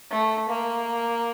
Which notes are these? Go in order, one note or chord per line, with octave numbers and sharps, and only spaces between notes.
A3
A#3